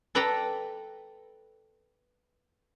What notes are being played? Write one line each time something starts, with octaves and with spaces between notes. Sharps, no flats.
A4 B4 D5 G5 A#5 B5